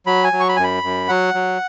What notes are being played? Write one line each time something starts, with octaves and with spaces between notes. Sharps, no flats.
F#3 B5
G#5
F#3
C#6
B5
F#2 G#5
B5
F#2
F#3 F#5
F#3